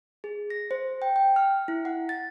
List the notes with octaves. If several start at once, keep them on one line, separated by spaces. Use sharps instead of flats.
G#4
A#6
C5
G5
G5
F6
E4
F#5
A6